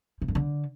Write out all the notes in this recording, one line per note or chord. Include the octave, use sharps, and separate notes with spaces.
C3
G2
D3